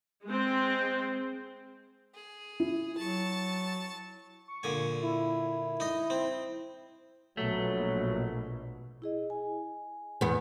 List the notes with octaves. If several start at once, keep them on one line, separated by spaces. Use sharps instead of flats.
G#3 C4
G#4
E4
F#3 A5 C#6
C#6
A#2 D3 G#5
E4
D#4 D#5
C4
A#1 B2 F#3 A3
E4 G#4 D#5
G#5
E2 B3